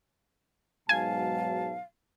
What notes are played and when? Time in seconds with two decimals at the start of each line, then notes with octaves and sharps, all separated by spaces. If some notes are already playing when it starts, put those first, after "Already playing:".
0.89 G#2 B2 F#3 F5 G#5 A5